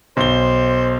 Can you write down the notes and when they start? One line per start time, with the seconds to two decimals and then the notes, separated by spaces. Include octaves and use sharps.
0.17 B1 C5 G7